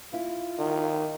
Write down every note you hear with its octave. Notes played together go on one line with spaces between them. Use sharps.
E4 F4
D#3